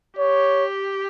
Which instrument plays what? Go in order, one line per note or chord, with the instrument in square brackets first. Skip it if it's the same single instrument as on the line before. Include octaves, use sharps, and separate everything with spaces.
[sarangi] G4 [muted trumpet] C#5